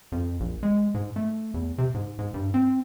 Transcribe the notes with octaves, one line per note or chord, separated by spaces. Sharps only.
F2
A#1
G#3
G#2
A3
E2
C3
G#2
G#2
G2
C4